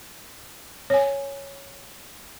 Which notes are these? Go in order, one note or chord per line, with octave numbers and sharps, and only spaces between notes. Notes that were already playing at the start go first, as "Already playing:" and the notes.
C#5 G#5